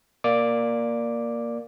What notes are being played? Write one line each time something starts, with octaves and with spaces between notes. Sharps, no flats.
A#3 D5 D6